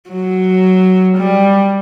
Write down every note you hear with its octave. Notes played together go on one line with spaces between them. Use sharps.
F#3
G3